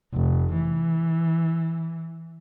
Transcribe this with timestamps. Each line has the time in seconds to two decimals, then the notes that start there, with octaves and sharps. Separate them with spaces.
0.14 F1
0.53 E3